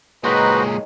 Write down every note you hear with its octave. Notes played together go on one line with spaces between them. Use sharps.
A#2 D#3 F#3 G#3 F#4 B4 C5 D#5